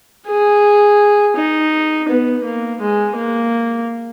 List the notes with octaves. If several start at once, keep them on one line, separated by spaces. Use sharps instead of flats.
G#4
D#4
B3
A#3
G#3
A#3